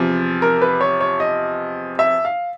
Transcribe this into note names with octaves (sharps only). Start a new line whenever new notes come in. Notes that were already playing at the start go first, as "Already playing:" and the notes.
Already playing: E2 C3 F3
A#4
B4
C#5
C#5
D#5
E5
F5